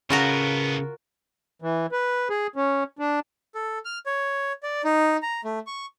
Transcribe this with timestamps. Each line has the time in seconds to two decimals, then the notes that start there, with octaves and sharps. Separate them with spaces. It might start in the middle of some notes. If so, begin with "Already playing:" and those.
0.10 A2 C#3 B3 F4 F#4 A#4
1.62 E3
1.92 B4
2.30 G#4
2.56 C#4
2.99 D4
3.55 A4
3.85 F6
4.06 C#5
4.63 D5
4.84 D#4
5.22 A#5
5.45 A3
5.67 C#6